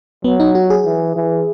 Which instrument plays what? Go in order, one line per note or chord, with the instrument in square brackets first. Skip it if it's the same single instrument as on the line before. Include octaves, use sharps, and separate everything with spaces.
[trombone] F#3 [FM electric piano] B3
[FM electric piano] D#4
F#4
G#4
[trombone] E3
E3